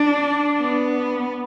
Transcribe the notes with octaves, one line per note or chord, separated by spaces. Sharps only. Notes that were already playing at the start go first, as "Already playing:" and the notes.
Already playing: D4
B3